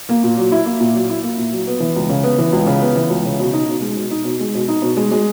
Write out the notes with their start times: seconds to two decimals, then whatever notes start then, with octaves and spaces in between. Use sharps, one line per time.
0.09 A#3
0.23 A#2
0.37 F#3
0.52 E4
0.65 A#3
0.81 A#2
0.94 F#3
1.09 E4
1.23 A#3
1.38 A#2
1.52 F#3
1.67 B3
1.80 E3
1.96 C#2
2.09 C#3
2.23 B3
2.38 E3
2.53 C#2
2.67 C#3
2.81 B3
2.96 E3
3.10 C#2
3.25 C#3
3.40 B2
3.53 D#4
3.68 B2
3.82 G#3
3.97 B2
4.11 D#4
4.25 B2
4.40 G#3
4.55 B2
4.68 D#4
4.82 B2
4.97 G#3
5.11 G#3